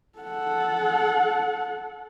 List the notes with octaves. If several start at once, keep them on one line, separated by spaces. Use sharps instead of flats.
A4 F#5